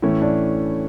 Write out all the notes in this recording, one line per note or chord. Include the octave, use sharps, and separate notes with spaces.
A2 E3 A3 C#4 E4
D4